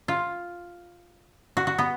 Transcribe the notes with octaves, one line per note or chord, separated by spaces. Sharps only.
F4
F#4
F#4
B3